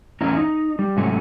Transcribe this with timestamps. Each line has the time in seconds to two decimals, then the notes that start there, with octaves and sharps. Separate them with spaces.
0.21 E2 A2 A#3 C#4 E4 A#5
0.37 D#4
0.79 G3
0.96 G#2 C3 F#3 A3 C#4 E4